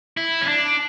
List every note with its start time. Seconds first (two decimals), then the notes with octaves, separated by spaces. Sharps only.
0.17 E4
0.41 C#4
0.48 D4